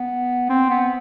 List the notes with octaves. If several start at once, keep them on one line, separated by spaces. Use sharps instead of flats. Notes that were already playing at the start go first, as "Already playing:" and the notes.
Already playing: B3
C4
B3